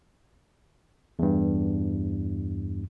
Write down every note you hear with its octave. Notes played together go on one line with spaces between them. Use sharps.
E2 G2